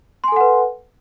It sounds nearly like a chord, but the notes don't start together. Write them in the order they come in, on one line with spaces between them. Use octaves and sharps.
C6 G#5 A4 F#5 B4